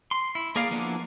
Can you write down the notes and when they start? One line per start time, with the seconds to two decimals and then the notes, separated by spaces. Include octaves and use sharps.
0.11 C6
0.35 E4
0.56 A#3 G#4 A#4 D5 F5
0.71 F3 A#3 B3 D4 E4